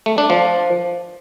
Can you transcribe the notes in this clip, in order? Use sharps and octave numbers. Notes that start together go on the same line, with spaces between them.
A3
D4
F3